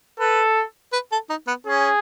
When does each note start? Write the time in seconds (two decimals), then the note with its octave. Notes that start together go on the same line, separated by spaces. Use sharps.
0.19 A4 B4
0.93 B4
1.12 A4
1.29 D#4
1.47 B3
1.66 C#4 G#4